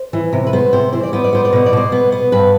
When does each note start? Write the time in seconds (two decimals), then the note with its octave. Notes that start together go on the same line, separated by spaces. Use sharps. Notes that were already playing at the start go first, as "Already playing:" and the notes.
Already playing: C5
0.13 E3
0.33 C3
0.47 B4
0.53 B3 C5
0.73 C3 C5
0.93 E3 C5
1.03 D5
1.13 B3 C5
1.24 D5
1.33 B3 C5
1.45 D5
1.53 B2 C5
1.66 D5
1.73 B2 C5
1.92 B3
2.12 B3
2.32 G2 B4